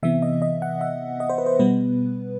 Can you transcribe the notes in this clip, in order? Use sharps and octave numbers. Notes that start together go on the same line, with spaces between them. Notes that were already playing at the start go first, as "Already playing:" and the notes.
C3 E3 B3 E5
D#5
D#5
F#5
E5
D#5
C5
B4
C5
B2 G3 B3 B4